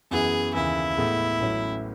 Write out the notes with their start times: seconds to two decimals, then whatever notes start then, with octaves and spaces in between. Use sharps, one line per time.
0.11 F#2 E3 B3 E4 G#4
0.55 D#2 C#3 E3 E4
0.97 A2 G#3 B3
1.40 A1 A2 F#3 C#4